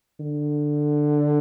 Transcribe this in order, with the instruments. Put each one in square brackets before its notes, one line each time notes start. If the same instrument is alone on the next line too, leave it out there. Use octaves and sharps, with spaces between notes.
[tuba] D3